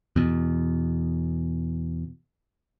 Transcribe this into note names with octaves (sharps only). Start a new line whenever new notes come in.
E2 B2